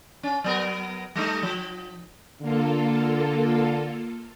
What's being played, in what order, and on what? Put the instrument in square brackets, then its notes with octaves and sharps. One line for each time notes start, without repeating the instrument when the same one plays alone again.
[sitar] C#4
F#3 B3 A#4
G3 A3 D#4
F3
[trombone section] D3 [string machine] A#3 F4 A4